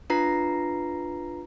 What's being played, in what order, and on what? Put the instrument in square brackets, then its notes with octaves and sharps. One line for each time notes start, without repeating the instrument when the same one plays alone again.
[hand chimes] D4 F4 B4 A#5 A#6 C7